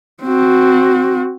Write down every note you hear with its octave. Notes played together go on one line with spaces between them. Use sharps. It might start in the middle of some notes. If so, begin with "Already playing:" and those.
C4 F#4